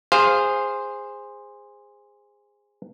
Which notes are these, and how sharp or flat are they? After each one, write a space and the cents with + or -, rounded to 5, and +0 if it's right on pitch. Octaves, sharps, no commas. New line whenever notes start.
G#4 -15 C5 +0 F5 +0